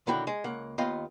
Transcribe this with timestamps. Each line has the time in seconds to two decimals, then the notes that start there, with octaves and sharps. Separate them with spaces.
0.07 B1 D3 D#3 E4 F#4 G5
0.27 G#3
0.44 C#2 A#3 F#5
0.78 D#2 B3 F4 D#5 F5 G5